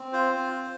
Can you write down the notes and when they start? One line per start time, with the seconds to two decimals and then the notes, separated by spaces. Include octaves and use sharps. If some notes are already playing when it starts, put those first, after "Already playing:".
Already playing: C4
0.13 F4 C5
0.32 C4
0.51 F4